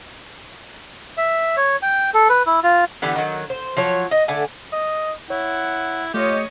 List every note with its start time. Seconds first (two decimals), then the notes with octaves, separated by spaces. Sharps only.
1.18 E5
1.57 C#5
1.82 G5
2.14 A4
2.29 B4
2.46 E4
2.64 F4
3.02 D3 E3 B3 G4
3.16 D#3 F#3
3.50 C5
3.77 F3 F#3 C#5
4.11 D#5
4.28 D3 A3 G#5
4.73 D#5
5.30 E4 C#5 F#5
6.14 A3 F4 G4 C#5 D#5